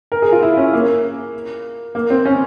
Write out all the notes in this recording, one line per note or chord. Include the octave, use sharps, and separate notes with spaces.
A#4
G#4
F4
E4
C#4
A#3
A#3
C4
C#4